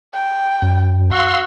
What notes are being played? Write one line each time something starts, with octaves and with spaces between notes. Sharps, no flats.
G5
F#2
F#4 F5 C6 E6